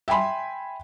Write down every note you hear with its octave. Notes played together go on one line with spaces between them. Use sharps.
E5 G5 G#5 B5 C6